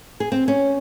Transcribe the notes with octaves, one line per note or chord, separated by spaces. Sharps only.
G#4
C4
C#4